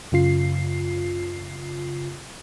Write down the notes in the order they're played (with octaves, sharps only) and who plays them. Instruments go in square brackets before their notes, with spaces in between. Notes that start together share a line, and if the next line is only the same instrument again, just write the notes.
[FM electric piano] F#2 C#3 F4 C7